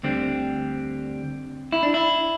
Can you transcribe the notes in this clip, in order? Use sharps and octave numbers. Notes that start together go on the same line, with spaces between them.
D2 D3 G3 C4
E4
D4
E4